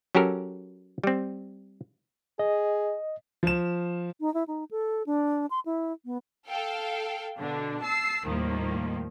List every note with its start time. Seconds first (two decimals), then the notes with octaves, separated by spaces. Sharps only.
0.15 F#3 C#4 G4 A4 A#4
1.04 G3 C4
2.39 G#4 D#5
3.43 F3 E7
4.21 D#4
4.34 E4
4.47 D#4
4.71 A4
5.06 D4
5.50 C6
5.66 E4
6.05 B3
6.48 A4 F5 G5
7.38 B2 D3 D4
7.81 A5 E6 C7
8.24 D#2 A2 D#3 F3 G3 A#3